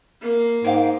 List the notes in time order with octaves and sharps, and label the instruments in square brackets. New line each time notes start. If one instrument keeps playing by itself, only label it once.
[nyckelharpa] A#3
[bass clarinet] G#2 [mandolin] F5 G5 D6